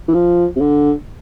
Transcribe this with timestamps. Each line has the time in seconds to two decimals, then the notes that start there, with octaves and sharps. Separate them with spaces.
0.08 E3
0.14 F3
0.56 C3
0.61 D3